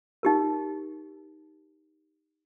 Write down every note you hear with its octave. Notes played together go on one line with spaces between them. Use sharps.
D#4 G4 A#4